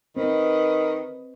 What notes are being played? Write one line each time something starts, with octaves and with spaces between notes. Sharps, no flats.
D#3 C4 B4 D#5